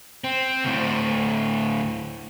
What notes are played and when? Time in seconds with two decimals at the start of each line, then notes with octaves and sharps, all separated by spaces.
0.24 C4
0.64 D2 A2